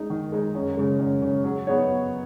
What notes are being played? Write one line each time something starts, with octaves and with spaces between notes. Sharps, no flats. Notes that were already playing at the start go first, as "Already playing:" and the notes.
Already playing: G#3 D#4
D#3
G#3 D#4
F#2
C#3 G#3
F#2
C#3 G#3
F#3
B3 D#4 G#4 C#5
F#3